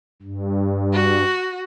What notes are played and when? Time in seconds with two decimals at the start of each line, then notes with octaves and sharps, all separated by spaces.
0.22 G2
0.94 F#4